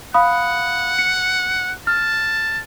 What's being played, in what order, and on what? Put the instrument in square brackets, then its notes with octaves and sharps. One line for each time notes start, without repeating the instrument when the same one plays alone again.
[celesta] F5 B5 D#6 [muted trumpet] F#5
[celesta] C#7
[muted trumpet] A5 [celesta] F6